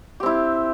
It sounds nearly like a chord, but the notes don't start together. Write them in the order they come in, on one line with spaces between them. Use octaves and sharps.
G4 C4 E4